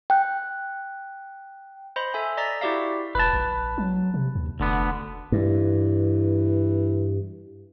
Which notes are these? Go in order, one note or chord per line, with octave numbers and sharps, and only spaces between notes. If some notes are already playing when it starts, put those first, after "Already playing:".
G5 F#6
C5 D#5 B5 C6
A4 E5 G#5
D5 D#5 A#5 A6 B6
E4 F#4 G4 D5 E5 F5
F1 B4 A5
A#1
F#3
C3
D#2
F1 D2 D3 B3
G2 E3